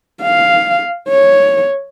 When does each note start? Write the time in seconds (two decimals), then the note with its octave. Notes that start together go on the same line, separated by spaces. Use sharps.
0.23 F5
1.09 C#5